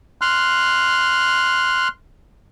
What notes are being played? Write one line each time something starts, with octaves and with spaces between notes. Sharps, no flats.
C6 F6 F#6